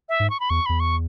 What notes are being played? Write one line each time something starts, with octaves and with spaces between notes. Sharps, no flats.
E5
G#2
C#6
B5
E2 C#6
E2 B5
C#6